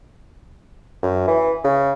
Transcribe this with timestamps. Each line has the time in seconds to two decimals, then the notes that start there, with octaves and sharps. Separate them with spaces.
1.03 F#2
1.27 E3
1.64 C#3